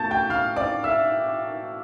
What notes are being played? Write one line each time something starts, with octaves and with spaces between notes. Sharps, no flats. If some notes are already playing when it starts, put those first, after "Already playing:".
Already playing: B2 A3 A5 G6 A6
G5 G6
F5 F6
D5 D6
E5 E6